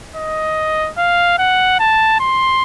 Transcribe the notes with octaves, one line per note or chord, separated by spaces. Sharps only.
D#5
F5
F#5
A5
C6